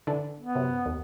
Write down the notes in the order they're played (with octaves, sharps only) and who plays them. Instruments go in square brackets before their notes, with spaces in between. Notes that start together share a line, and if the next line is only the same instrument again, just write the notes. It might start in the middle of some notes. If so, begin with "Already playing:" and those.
[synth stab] D3 E3 D4
[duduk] B3
[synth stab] F#2 C3
D#2